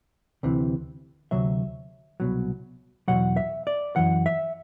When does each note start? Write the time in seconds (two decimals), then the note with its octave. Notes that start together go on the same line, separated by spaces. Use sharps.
0.43 D2 C3 E3
1.31 D2 C3 F#3 E5
2.20 C2 B2 F#3
3.08 E2 B2 F#3 F#5
3.37 E5
3.67 D5
3.96 F#2 E3 F#5
4.26 E5